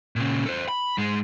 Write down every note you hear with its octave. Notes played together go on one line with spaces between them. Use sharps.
A#2 C#3
A4 C5
B5
G#2 G#3